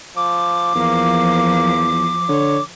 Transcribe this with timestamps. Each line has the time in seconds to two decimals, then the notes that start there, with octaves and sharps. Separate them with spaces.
0.16 F3 D6
0.75 E2 F3 A#3
2.29 D3 C#5